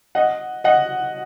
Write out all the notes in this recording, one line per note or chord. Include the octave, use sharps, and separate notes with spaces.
D#5 F#5
D#5 F#5